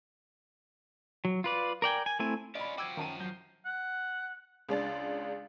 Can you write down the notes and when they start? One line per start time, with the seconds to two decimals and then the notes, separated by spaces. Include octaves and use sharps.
1.25 F#3
1.44 F4 B4 D5
1.82 A#4 D5 G5 G#5
2.06 G#5
2.19 A3 C4 E4 G#5
2.55 C#4 F4 D5 D#5 B5
2.78 F3 F#4 G5 D6 E6 G#6 D#7
2.97 F#2 D#3 A5 D#7
3.20 F#3 G6 C7
3.65 F#5
4.69 C#2 G#3 D4 A6